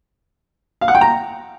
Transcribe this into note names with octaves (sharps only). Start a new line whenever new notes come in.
F5
F#5
G5
A#5